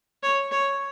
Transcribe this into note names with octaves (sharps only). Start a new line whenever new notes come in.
C#5
C#5